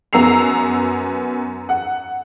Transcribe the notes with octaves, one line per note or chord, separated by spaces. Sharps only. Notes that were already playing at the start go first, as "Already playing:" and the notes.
F#2 B3 A#5 E6 C7 F7
F#5